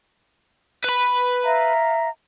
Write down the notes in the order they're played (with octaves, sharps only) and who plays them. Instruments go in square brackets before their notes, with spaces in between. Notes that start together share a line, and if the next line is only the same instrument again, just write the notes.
[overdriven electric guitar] B4 B5
[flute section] E5 F5 A#5